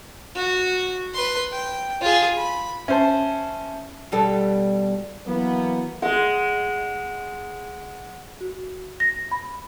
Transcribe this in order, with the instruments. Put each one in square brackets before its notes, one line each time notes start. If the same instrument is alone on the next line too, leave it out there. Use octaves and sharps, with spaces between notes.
[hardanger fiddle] F#4
B4 C6
G5
F4 G#4
B5
[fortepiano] C#4 C5 [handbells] E5 A5
[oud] B2 G3 A4
[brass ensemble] E3 F#3 A#3 B3
[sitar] G#3 [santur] D#5 F#5
[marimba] F#4
A#6
B5